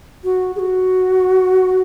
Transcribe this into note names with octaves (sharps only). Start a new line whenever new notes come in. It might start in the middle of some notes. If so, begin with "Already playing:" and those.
F#4
G#4
F#4